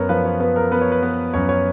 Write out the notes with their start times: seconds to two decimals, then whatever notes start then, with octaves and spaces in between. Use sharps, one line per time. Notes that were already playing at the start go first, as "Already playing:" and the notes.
Already playing: F#2 B3 A#4 C#5
0.09 F3 B4
0.25 C#5
0.40 B3 B4
0.56 A#4
0.71 B3 B4
0.81 C#5
0.92 B4
1.03 B3
1.34 F#2 C#5
1.49 C#5